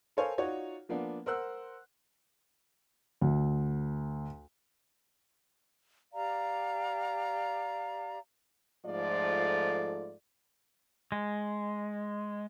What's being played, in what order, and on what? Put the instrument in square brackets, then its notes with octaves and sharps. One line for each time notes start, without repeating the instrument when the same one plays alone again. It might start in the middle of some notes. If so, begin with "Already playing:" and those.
[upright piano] A4 A#4 C5 C#5 F5 G#5
D#4 F4 F#4 C#5 D5
F3 A#3 B3 D4
A#4 C5 F#5 C6 E6 F#6
[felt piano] D2
[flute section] G4 D5 F5 A#5
[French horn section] G#2 F3 A3 F4 A4 D5
[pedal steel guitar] G#3